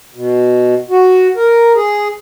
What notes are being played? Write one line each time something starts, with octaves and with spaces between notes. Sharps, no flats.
B2
F#4
A#4
G#4